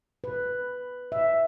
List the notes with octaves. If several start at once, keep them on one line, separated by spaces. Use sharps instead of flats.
B4
E5